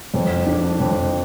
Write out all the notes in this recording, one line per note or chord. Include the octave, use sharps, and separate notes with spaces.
F2
D4
F2